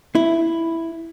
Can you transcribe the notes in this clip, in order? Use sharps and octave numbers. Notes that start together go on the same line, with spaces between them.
E4